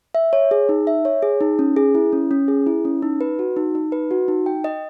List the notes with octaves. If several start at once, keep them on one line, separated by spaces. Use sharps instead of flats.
E5
C#5
G#4
D#4
E5
C#5
G#4
D#4
C#4
G#4
E4
C#4
C#4
G#4
E4
C#4
D#4
B4
F#4
D#4
D#4
B4
F#4
D#4
G5
D#5